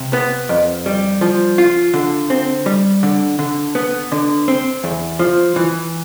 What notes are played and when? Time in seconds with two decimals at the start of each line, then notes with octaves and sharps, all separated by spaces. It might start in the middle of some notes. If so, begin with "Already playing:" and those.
Already playing: C3
0.13 B3
0.49 F2
0.86 G3
1.21 F3
1.58 F4
1.94 D3
2.30 C4
2.66 G3
3.03 D3
3.39 D3
3.75 B3
4.12 D3
4.48 C4
4.84 E2
5.19 F3
5.56 E3